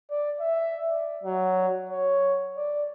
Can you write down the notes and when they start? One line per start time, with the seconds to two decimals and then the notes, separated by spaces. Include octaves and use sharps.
0.10 D5
0.41 E5
0.90 D5
1.23 F#3
1.89 C#5
2.57 D5